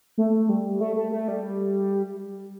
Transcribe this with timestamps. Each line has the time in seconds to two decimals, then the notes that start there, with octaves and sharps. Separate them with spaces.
0.18 A3
0.49 G3
0.81 A3
0.96 A3
1.12 A3
1.28 G3